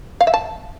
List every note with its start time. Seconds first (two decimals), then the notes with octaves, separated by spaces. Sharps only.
0.21 F5
0.27 E5
0.34 A5